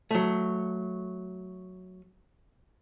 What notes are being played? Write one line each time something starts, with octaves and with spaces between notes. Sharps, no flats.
F#3 A3